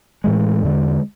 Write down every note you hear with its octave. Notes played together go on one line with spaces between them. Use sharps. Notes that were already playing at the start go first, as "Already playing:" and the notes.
A2 E3 G#3
E2 D3 G#3